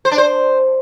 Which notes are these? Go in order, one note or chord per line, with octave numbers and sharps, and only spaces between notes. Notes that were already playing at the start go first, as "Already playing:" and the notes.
C5
D4
C5